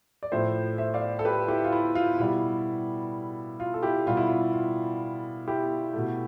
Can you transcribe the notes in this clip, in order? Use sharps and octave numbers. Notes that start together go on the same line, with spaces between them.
D5
A2 F3 A3 C5 E5
C5 E5
D5 F5
A4
G4 B4
E4 G4
F4
E4
F4
B2 G3 E4
F4
A4
E4 G4
B2 G3 F4
E4
F4
F4
E4 G4
B2 A3